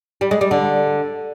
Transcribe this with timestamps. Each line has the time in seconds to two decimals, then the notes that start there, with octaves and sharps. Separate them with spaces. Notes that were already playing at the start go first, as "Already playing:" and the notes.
0.21 G3
0.31 G#3
0.41 G3
0.51 D3